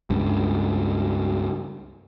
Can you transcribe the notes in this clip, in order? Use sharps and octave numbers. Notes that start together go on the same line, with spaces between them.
C#2 G2